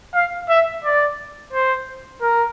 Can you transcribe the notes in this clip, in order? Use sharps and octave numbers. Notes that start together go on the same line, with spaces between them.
F5
E5
D5
C5
A#4